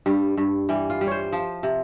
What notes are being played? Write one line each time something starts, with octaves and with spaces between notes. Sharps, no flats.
G2 G3
G2
E3 G3
F4
G3
C5 C#5
F3
C3